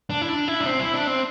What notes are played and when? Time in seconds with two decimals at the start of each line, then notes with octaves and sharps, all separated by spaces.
0.10 D4
0.21 E4
0.29 D4
0.48 E4
0.60 D4
0.66 C4
0.80 E4
0.94 D4
1.07 C4